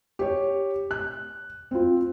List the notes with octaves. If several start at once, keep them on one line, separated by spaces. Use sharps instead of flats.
G4 C#5
F#6
C4 F4